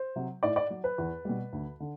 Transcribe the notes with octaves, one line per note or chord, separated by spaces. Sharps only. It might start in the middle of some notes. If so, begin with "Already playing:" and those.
Already playing: C5
C3 F#3
A2 D5
D5
F#3
B4
E2
B2 G3
D2
D3